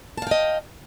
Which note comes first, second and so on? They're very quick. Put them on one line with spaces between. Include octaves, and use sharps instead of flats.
A5 F5 G5 D#5